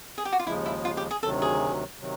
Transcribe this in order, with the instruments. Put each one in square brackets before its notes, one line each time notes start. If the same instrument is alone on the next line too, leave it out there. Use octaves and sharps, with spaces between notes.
[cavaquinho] G#4
G4
F#4
F4
[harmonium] D#2 C#3 F3 G#3 [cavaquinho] E4
[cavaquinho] E4
F4
G4
G#4
[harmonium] D2 C3 D#3 F#3 [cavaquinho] A4
[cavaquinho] G#4
[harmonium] C3 D#3 F#3